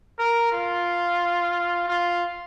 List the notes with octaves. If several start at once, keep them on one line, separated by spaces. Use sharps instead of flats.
A#4
F4
F4